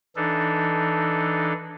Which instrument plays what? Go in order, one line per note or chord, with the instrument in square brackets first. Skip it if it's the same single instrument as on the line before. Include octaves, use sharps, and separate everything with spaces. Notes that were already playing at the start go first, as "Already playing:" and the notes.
[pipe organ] E3 D4 D#4 A4